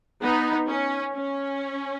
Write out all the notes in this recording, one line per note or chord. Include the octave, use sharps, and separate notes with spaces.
B3 D#4
C#4
C#4